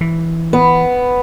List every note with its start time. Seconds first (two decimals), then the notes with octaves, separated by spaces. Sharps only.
0.01 E3
0.53 B3